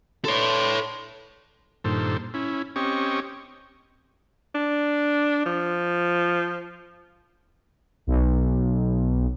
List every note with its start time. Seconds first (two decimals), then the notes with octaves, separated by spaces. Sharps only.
0.25 D4 A4 B4 C#5 C6
1.84 G2 A#2 D#3 A4 C5
2.34 C#4 E4
2.76 C4 C#4 G4 D#5 C#6
4.55 D4
5.46 F3
8.07 B1